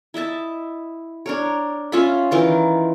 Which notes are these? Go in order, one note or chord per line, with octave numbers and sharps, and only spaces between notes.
E4 D#5 E5 A5
D4 A#4 C#5
C#4 F4 E5 B5
D#3 E3 F4